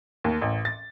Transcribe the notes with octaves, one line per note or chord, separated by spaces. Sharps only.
D#2
A1
A6